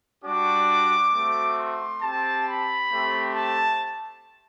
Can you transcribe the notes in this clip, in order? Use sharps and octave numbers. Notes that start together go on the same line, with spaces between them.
G3 D4 F#4 D6
A3 C4 F#4
C6
C4 G4 A5
B5
A3 C4 G4
A5